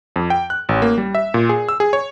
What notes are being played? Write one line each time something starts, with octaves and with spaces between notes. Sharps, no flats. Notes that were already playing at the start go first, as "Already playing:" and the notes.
F2
G5
F#6
A1
A#3
G3
E5
A#2
G#4
E6
G#4
C#5